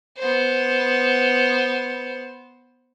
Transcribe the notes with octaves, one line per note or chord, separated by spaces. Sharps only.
B3 C5